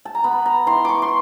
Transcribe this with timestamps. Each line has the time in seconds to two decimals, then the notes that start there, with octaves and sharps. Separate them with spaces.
0.05 A5
0.15 A#5
0.24 B3 B5
0.46 A#5
0.67 E3 C6
0.85 C#6 D6
1.02 C6